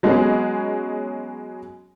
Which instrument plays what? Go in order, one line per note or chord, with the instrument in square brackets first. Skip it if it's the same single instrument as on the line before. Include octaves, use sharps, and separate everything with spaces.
[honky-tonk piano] F#3 G#3 B3 C#4 G#4